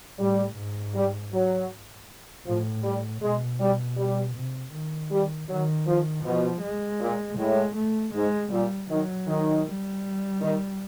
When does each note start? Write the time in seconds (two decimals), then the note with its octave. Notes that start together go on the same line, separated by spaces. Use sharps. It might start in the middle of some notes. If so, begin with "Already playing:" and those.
0.19 A2 G3
0.57 G#2
0.95 G3
1.32 F#3
2.46 A2 F3
2.83 G3
3.22 B2 G#3
3.60 G3
3.97 G3
4.36 C3
4.73 D#3
5.11 G3
5.48 D#3 F#3
5.87 F3
6.24 B2 F3
6.62 G#3
7.00 A#2
7.38 A2 G#3
7.76 A3
8.14 G#2 G#3
8.51 A#2 G3
8.89 D#3 F#3
9.27 D#3
9.66 G3
10.41 D#3